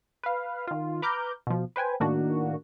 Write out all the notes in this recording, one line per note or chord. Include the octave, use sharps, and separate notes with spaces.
B4 F5
D#3 F4
B4 A#5 D6 F6 G6
B2 F3
B4 C5 G5 G#5
A2 D#3 A#3 D4 F#4